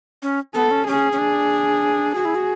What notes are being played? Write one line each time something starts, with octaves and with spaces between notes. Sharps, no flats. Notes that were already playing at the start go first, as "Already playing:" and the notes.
C#4
B3 A4
C#4
C#4 G#4
C#4
D4
F#4 G#4
E4
F#4